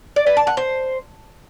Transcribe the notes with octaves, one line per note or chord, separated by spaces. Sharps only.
D5
B4
A5
F#5
C5